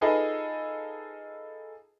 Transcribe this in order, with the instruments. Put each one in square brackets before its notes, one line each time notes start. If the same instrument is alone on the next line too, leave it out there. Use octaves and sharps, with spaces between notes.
[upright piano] D#4 F4 G#4 A4 B4 D#5